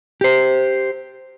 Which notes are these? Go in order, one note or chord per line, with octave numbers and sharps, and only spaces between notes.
G4 C5